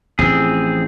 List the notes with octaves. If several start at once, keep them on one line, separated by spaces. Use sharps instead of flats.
A1 F2 A2 C4 G#4